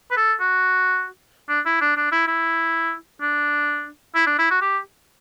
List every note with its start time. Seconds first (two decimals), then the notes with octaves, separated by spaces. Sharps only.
0.11 B4
0.17 A4
0.40 F#4
1.49 D4
1.66 E4
1.81 D4
1.96 D4
2.12 E4
2.27 E4
3.21 D4
4.15 E4
4.27 D4
4.39 E4
4.51 F#4
4.61 G4